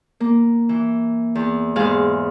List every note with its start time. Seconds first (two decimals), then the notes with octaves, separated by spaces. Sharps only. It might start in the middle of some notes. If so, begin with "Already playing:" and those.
0.20 A#3
0.69 E3
1.35 E2
1.76 E2 G#2 G#4 F5